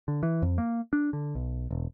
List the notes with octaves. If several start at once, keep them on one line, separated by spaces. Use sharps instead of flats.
D3
E3
F2
A#3
D4
D3
B1
E1